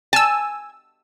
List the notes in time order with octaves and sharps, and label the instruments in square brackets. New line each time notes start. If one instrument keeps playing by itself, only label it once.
[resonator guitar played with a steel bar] G#5 [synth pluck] A5 E6